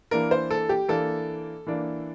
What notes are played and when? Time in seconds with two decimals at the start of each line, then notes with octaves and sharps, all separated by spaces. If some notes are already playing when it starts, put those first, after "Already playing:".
0.11 E3 A#3 D4 A#4
0.31 C5
0.51 A4
0.69 G4
0.89 E3 A#3 D4 A4
1.66 E3 A#3 D4